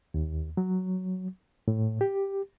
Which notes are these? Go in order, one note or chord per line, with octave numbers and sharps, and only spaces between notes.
D#2
F#3
A2
G4